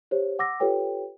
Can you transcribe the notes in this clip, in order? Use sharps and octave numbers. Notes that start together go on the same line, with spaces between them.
G4 C5 C#5
F#5 D6 E6 A#6
F4 G4 A4 B4 C#5 G5